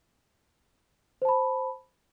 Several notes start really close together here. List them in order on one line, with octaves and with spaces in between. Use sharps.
C5 A5 B5